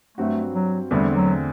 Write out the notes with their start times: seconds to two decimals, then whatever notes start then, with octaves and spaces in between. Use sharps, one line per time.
0.17 G2 F#3 A3 C4 F#4
0.54 F#3
0.91 E2 D3 G3 A3 C4
1.16 F#3